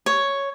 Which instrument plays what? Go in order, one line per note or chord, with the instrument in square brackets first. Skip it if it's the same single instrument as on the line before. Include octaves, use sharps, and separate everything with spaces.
[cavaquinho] C#5